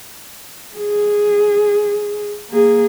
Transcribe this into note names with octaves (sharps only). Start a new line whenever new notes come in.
G#4
A#3 G#4